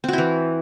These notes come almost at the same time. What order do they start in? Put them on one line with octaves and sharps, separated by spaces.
C4 F#4 E4 E3